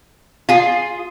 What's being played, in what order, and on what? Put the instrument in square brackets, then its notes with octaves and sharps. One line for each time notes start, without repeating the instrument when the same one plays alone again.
[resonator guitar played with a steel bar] F4 G#4